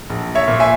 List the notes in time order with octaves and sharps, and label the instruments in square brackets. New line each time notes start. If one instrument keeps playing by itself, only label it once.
[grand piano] A#1
C#5 E5
A#2
E5 G#5